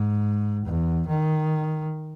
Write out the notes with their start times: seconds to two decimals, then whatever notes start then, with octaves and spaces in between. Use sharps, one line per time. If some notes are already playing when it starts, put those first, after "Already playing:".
Already playing: G#2
0.65 E2
1.08 D#3